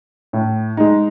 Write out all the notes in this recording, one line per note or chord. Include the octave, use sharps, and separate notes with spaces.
A2
G#3 D#4